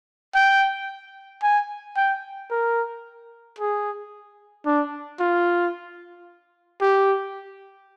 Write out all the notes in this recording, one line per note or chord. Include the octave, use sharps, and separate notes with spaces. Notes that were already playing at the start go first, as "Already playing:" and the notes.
G5
G#5
G5
A#4
G#4
D4
F4
G4